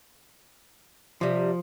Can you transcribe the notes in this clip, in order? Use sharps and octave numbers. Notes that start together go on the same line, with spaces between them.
C3 F3 G3